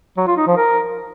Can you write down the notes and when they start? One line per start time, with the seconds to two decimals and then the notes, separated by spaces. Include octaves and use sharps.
0.17 F#3
0.27 F4
0.37 D#4
0.47 F3
0.57 A#4